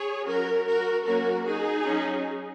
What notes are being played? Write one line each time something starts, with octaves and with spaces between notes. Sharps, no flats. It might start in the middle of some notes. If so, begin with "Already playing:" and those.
Already playing: G#4 C#5
F#3 C#4 F#4 A#4
F#4 A#4
F#3 A#3 C#4 F#4 A#4
D#4 G#4
F#3 C#4